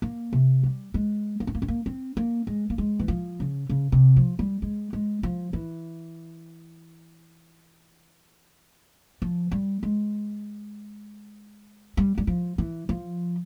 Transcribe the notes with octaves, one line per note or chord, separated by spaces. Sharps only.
A#3
C3
G3
G#3
A#3
C4
A#3
C4
A#3
C4
A#3
G#3
A#3
G#3
E3
F3
C#3
C#3
C3
F3
G3
G#3
G#3
F3
E3
F3
G3
G#3
G3
G3
F3
E3
F3